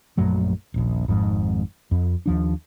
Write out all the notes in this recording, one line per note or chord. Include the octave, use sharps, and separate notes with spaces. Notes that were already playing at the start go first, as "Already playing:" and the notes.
A#1 F#2 F#3 A3
D#1 A#1
G#1 F2 G#2
F2
D#2 F3 D4